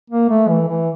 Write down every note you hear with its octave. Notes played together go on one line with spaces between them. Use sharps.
A#3
A3
E3
E3